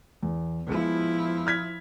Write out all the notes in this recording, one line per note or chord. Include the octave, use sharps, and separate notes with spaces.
E2
F3 G#3 B3 E4
F6 G#6 B6